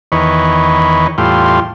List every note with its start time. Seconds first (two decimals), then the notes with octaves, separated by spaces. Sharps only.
0.12 E2 D#3 B4 C#5
1.18 E2 A2 G3 F4 C6